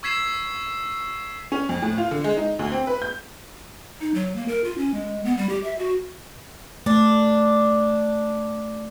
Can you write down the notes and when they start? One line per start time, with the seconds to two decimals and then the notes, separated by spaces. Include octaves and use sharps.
0.03 C#6 E6 G#6 B6 C7 E7
1.52 C#4
1.69 F2
1.82 A2
1.98 F4
2.11 D3
2.24 G#3
2.37 D#4
2.59 D2
2.72 C4
2.87 B4
3.02 G6
4.00 D#4
4.14 F#3
4.36 A#3
4.48 A#4
4.64 F4
4.78 C#4
4.94 G#3
5.25 B3
5.38 G3
5.49 G4
5.64 E5
5.79 F#4
6.86 A3 D4